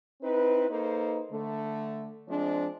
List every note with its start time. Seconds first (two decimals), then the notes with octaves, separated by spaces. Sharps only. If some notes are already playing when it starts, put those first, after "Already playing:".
0.22 C4 D#4 E4 B4
0.70 A#3 D#4 A4 B4 C5
1.31 D3 A3
2.29 F3 G#3 C4 D4